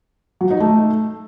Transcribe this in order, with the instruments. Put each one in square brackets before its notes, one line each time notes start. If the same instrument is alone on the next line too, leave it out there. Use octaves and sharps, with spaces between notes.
[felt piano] F#3
D#4
A3